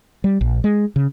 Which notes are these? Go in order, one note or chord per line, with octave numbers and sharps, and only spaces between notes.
G3
A#1
G#3
C#3